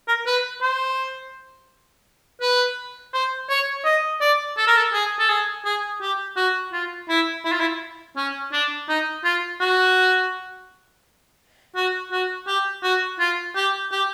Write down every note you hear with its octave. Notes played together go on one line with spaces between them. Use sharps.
A#4
B4
C5
B4
C5
C#5
D#5
D5
A4
A#4
A4
G#4
A4
G#4
G#4
G4
F#4
F4
E4
E4
F4
E4
C#4
D4
D#4
F4
F#4
F#4
F#4
G4
F#4
F4
G4
G4